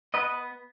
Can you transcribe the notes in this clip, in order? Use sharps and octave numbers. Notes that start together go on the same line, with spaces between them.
B3 B4 D#5